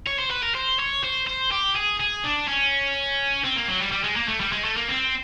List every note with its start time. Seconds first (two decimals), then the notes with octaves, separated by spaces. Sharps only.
0.07 C#5
0.19 C5
0.31 B4
0.43 A#4
0.55 C5
0.79 C#5
1.04 C5
1.27 C5
1.52 G4
1.75 G#4
2.00 G#4
2.24 D4
2.48 C#4
3.44 C4
3.56 A#3
3.68 F#3
3.80 G3
3.92 G3
4.04 G#3
4.16 A#3
4.28 A3
4.40 G3
4.52 G#3
4.64 A3
4.77 A#3
4.88 C4